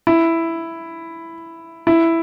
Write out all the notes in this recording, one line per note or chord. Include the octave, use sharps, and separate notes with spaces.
E4
E4